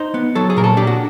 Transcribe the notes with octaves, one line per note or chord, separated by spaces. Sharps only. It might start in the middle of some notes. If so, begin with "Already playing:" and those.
Already playing: D#4 C5
B3
F#3 A4
G#4
A#2 A#4
A4
D4 G4
F#4